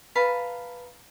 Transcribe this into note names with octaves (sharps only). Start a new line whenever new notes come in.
B4 F5 A5 A#5